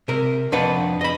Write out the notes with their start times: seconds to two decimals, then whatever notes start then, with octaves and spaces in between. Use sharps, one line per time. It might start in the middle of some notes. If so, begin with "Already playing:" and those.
0.08 C3 A#4
0.52 F2 D4 B4 F#5
1.01 D#5 B5